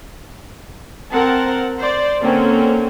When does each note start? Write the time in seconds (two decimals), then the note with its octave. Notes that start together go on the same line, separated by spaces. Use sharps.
1.12 C4 A#4 F#5 A5
1.78 C5 D5
2.22 D3 A#3 C4 C#4